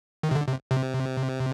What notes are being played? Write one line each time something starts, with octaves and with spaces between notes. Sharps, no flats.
D#3
C3
D3
C3
C3